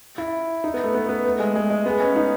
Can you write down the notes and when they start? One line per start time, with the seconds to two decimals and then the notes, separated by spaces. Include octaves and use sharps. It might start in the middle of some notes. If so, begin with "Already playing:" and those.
0.18 E4
0.64 D#4
0.74 B3
0.84 A3
0.94 B3
1.09 B3
1.25 A3
1.40 G#3
1.55 G#3
1.70 G#3
1.86 B3
2.00 C#4
2.16 D#4